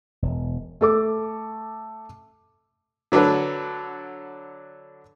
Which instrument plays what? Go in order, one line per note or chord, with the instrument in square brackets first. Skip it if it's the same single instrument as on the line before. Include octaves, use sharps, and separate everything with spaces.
[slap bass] E1
[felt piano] A3 A4 D6
[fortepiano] D3 F#3 D4 A4 B4